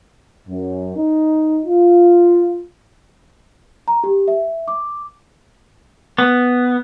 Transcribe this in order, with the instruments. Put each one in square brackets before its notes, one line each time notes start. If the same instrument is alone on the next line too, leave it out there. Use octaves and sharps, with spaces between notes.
[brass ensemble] F#2
D#4
F4
[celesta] A#5
G4
E5
D6
[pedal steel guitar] B3